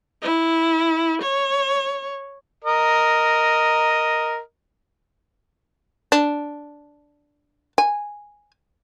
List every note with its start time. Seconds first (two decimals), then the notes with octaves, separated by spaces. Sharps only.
0.22 E4
1.22 C#5
2.64 A#4 D#5
6.12 D4
7.78 G#5